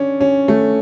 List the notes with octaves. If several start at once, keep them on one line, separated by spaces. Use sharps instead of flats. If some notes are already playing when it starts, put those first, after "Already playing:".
Already playing: C#4 D4
C#4
A3